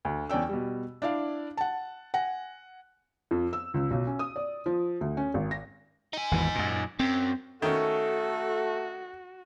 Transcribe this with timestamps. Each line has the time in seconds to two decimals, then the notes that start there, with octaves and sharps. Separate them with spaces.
0.05 D2
0.29 E2 C#4 D5 G5 E6
0.49 B2 G3
1.02 D4 E4 D5 F5
1.57 F#5 A5
2.14 F#5 G#5 A#6
3.31 F2
3.53 E6
3.74 C#2
3.91 B1
4.07 C#4
4.19 D#6
4.36 D5
4.66 F3
5.01 D2
5.17 C#4
5.34 G#1
5.51 A#6
6.13 D#4 G#5
6.31 G#1 E2 E3
6.55 F#2 A#2
7.00 F#2 C4
7.62 D#3 A3 C#4 F#4 A4